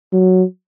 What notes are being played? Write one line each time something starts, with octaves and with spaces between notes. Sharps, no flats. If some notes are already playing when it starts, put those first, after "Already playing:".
F#3